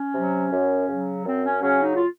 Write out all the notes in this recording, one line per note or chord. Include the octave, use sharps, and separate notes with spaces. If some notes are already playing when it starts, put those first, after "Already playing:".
Already playing: C#4
C3 F#3
F#2
C#3 F#3
F#2 C4
C#4
C#3 F#3 C#4
D#4
F4